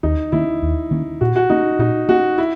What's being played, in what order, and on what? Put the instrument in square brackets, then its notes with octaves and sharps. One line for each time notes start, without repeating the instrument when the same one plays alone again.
[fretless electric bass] D#2 [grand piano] D#4
[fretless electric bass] D#3 A#3 C#4 [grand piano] E4
[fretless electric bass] D#2
D#3 A#3 C#4
[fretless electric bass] A#2 [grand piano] F#4
[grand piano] F#4
[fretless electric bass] A#3 C#4 [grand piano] D#4
[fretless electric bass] A#2 [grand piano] D#4
[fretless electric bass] A#3 C#4 [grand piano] F#4
[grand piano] E4